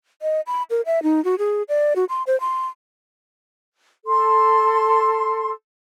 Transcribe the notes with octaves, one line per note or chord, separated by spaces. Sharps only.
D#5
B5
A#4
E5
D#4
F#4
G#4
D5
F#4
C6
C5
C6
A4 C6